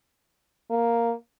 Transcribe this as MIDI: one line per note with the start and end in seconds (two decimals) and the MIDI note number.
0.71 1.13 58